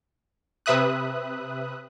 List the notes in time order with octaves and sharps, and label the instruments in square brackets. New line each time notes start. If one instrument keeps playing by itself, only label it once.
[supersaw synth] C3 B4 E5 D#6 F#6